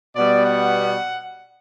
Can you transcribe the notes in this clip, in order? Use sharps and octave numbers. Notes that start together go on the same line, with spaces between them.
B2 G3 B3 D5
F#5